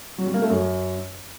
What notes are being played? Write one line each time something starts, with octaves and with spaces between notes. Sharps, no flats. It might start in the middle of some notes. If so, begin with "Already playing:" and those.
F#3
G3
A#3
A3
F#2